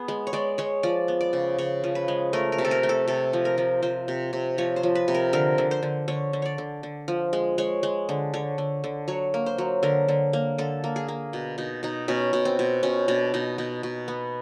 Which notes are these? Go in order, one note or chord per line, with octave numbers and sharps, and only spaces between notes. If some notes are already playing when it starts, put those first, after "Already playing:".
Already playing: B3 G#4
G#3
C#5
G#3 D5
G#3 C#5
F3 D5
B3
D5
C#3
C#3 C#5
F3
B4
G#3
A3 A#4
A#4
C3
A4
A#4
A3
A4
C3 A4
F3
A#4
F3
F3 C5
C3
C3
F3 C#5
C5
F3
B4
C3
A#4
D3 A#4
D3
C5
D3
D3 C#5
D3
C#5 D5
D3
D3
F3
G#3
G#3 C#5
G#3
D3
D3 C#5
D3
D3
F#3 C#5
A#3
C5
F#3
D3 A#4
D3
A#3
D3 A4
A#3
G#4
A#3
B2
B2 D#4
B2 D#4
B2 C#4
B2
C4
B2
B2 C#4
B2 D4
B2 D#4
B2 D#4
B2
B3